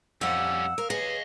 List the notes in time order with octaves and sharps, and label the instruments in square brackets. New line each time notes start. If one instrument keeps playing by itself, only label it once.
[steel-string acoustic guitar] F2 F#5 [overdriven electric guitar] G3 C#4 [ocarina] E6
[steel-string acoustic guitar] A#4 F5
[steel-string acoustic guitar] G#4 C#5 [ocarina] B4 [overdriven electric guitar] D#5 F5